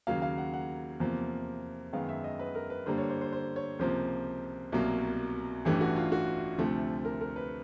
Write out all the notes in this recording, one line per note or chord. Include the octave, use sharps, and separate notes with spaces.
D#2 C#3 F#3 A#3 F5
F5
F#5
F#5
E2 C3 F3 A#3
F#2 D#3 G#3 B3 F5
E5
D#5
B4
A#4
B4
G2 D3 G3 A#3 C5
C#5
C5
C5
C5
C#5
C#2 C3 F3 A#3 C5
C2 B2 F#3 A#3
A1 G2 E3 A3 G4
F#4
F4
F#4
D2 C3 F3 A3
A#4
A#4
B4